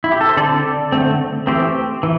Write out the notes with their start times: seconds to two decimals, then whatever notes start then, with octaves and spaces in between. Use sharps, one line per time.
0.04 E4
0.12 G4
0.21 A4
0.29 C5
0.37 D3 C4 A4 D5
0.92 D3 A3 C4
1.47 E3 A3 C4 G4 C5
2.03 E3